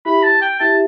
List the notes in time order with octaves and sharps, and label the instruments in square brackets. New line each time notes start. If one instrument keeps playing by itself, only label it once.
[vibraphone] E4 G4 E5 [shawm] B5
[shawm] A5
G5
[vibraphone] E4 G4 E5 [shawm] A5